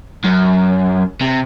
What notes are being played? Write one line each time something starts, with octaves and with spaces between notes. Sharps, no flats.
F#2
C3